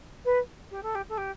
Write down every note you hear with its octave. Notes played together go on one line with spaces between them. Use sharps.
B4
G4
A4
G4
A4
G4